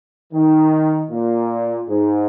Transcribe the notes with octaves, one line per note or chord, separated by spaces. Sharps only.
D#3
A#2
G#2